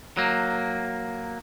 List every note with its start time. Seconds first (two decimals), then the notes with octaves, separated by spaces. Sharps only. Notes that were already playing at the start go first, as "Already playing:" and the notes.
0.17 F#3 A#3